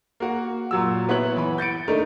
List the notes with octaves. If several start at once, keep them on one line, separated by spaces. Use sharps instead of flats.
A#3 F#4
A#2 F#3 E6
B3 E4 C#5 F#6 F#7
E3 B5
G6 A6 C#7 D7
A3 D4 D#4 A#4